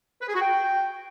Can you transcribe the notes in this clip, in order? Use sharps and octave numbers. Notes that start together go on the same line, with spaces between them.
B4
G#4
F#4
G5